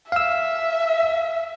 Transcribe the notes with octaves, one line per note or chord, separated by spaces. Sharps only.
E5 F5 E6